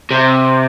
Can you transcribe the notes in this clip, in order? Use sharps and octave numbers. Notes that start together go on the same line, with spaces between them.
C3